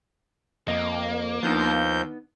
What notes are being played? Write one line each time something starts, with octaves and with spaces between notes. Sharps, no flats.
F2 A#3 D#5
D#2 F3 B3 D4 D#4 G6